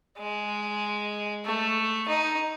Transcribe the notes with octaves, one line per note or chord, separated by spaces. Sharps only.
G#3
A3
D#4